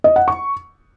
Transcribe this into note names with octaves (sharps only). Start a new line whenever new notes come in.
D#5
F#5
C#6